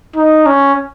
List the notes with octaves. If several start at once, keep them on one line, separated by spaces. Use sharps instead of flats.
D#4
C#4